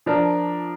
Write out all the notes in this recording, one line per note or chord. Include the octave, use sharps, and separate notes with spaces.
F3 D4 A#4 D5